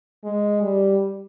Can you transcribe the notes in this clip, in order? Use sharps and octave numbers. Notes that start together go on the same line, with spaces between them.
G#3
G3